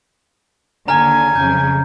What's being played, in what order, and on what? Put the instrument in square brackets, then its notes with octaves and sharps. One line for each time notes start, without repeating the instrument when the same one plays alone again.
[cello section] D#2 D3 [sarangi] G#5 [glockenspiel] A#5 F6
[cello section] F2 C#3 F#3 [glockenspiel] G6